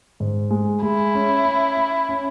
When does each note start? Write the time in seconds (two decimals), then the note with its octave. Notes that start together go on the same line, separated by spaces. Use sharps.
0.20 G#2
0.51 G#3
0.82 G#3 E4
1.15 C#4
1.45 C#4
1.77 C#4
2.09 C#4